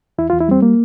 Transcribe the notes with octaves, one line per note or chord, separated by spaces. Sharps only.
E2 E4
F4
E2
E4
G3 C4
A#3